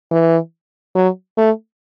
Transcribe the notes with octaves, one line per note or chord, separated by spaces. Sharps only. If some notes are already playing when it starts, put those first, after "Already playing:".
E3
F#3
A3